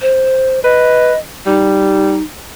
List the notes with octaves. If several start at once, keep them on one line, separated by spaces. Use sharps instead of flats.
C5
B4 D#5
G3 D#4